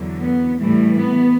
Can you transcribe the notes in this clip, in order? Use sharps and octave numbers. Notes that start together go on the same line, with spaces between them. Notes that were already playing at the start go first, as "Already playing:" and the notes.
Already playing: E2 D3 F#3
B3
A2 E3 G3 A3
B3